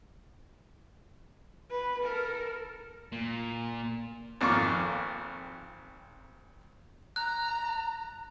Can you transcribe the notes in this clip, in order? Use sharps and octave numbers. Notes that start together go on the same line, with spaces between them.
B4
A4 A#4
A#2
G#1 F2 A#3 F4 C#6 D6
A#5 F#6